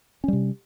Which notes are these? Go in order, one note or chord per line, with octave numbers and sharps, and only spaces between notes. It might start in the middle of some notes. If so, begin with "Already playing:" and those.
C3 G3 C#4